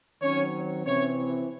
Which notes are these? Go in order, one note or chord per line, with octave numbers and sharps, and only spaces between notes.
D#3 F#3 C4 C#4 C#5
C3 E3 C4 C#4 E4 C#5